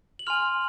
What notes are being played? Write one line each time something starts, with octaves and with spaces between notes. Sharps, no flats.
F#7
G#5 C6 F6 F7